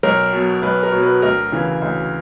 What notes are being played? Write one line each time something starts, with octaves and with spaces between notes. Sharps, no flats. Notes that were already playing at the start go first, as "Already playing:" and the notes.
B1 A#4
B2 F#3
B1 B4
A#4
B2 F#3
B4
D2 A#4
C#3 E3
D2